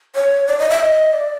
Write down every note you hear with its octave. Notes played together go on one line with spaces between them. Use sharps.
C#5
D5
D#5
E5
D#5
D5